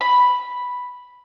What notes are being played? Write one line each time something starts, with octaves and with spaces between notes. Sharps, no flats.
B5